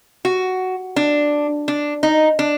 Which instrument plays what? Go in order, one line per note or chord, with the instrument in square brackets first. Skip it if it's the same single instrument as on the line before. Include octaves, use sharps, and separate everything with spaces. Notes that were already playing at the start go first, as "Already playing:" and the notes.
[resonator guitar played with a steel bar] F#4
D4
D4
D#4
D4